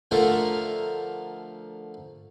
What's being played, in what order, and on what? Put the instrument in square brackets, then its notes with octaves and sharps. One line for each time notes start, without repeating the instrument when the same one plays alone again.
[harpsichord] D3 F3 A3 A#4 C5